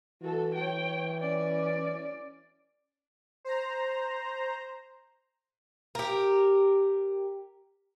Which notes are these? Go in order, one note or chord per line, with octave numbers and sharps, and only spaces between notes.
E3 F#4 A4
C#5 G5
C#4 D5
C5 A#5
G4 A#4